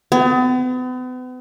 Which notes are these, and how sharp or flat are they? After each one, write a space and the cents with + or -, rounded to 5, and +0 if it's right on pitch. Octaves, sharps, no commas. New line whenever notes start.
B3 +40